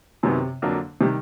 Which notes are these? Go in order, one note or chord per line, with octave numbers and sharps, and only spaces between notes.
F#2 C3 D#3 F#3 B3
F2 D3 F#3 A#3 D4
C3 D#3 G3